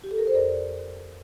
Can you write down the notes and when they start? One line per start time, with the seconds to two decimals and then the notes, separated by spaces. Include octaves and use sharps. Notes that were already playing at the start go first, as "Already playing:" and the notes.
0.04 G4
0.11 A4
0.18 A#4
0.27 C5
0.34 F2 A#4 D5